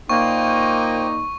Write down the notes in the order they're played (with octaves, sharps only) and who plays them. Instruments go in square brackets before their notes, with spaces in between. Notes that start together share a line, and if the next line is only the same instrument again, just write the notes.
[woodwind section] A#2 A#3 [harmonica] D#4 [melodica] C5 G5 [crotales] C#6